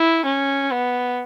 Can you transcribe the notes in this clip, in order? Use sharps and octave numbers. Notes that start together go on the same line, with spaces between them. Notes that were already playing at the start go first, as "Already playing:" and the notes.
Already playing: E4
C#4
B3